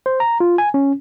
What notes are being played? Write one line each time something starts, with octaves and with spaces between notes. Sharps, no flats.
C5
A#5
F4
G#5
C#4